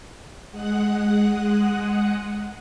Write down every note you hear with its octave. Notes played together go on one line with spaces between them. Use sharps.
G#3 F#5 D#6 F#6